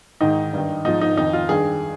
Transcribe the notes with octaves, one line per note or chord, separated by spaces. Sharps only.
G#2 D#3 D#4
G2 D#3
G#2 F3 D#4
D#4
F2 D#3 D#4
F4
G2 D#3 G#4